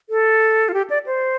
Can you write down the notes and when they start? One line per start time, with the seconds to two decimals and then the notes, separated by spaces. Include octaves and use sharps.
0.10 A4
0.69 F4
0.74 G4
0.90 D5
1.06 C5